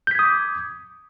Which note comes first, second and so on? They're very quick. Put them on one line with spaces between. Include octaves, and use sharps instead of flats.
G6 B6 G#6 D#6 D6